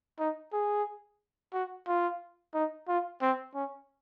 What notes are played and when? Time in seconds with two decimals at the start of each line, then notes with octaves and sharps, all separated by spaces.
0.19 D#4
0.53 G#4
1.53 F#4
1.87 F4
2.54 D#4
2.88 F4
3.21 C4
3.54 C#4